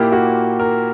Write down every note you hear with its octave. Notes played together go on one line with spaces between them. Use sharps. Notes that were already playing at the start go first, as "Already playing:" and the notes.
Already playing: A#2 A#3 E4 G4
F#4
A#4